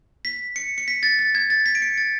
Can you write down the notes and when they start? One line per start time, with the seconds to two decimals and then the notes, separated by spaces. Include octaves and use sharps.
0.25 B6
0.56 C#7
0.78 C#7
0.88 B6
1.03 A6
1.19 A6
1.35 G#6
1.50 A6
1.66 B6
1.75 D7
1.82 C#7
1.98 A6